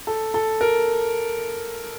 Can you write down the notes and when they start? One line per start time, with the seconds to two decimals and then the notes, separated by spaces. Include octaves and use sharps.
0.07 A4
0.34 A4
0.61 A#4